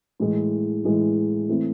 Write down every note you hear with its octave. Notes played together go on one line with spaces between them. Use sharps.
A2 E3 G#3
A2 E3 G#3
E3 A3 C4 E4